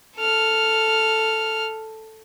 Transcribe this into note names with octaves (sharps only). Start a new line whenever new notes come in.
A4 F6